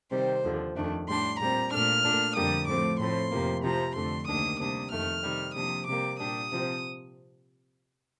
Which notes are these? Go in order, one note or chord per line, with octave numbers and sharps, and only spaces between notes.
C3 D#3 G3 C4 C5
D#2 D3 F3
F2 D#3 A3 D4
A2 G3 D4 C6
A#2 G3 C4 A#5
A#2 A3 D4 F6
A#2 A3 D4
F2 D3 G3 A#3 D#6
A2 F3 A3 C4 D6
A2 F3 A3 C4 C6
F2 C3 F3 A#3
C3 F3 C4 A#5
F2 D3 A3 D4 C6
D2 C3 D#3 A#3 D4 D#6
C3 G3 A#3 D4 D#6
F2 D#3 A3 F6
C3 D#3 G3
C3 F3 A#3 D4 D#6
C3 G3 A#3 D6
A#2 G3 D4 D#6
C3 F3 C4